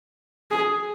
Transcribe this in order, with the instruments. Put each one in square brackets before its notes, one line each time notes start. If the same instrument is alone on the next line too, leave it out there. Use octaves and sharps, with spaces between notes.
[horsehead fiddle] G#4